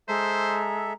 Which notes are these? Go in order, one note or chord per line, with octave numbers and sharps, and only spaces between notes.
G#3 A4 C5 E5 A#5